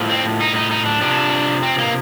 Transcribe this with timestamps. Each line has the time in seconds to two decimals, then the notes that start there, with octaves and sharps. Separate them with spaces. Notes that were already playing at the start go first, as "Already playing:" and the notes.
Already playing: A2 F3
0.09 C4
0.41 D#4
0.56 D#4
0.71 D#4
0.85 D4
1.01 C3 F3 D4
1.63 C4
1.78 A#3